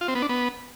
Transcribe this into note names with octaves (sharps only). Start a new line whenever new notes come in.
F4
C4
B3
D4
B3